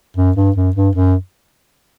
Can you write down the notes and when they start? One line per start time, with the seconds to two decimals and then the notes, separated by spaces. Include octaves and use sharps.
0.17 F#2
0.36 G2
0.56 F#2
0.76 G2
0.95 F#2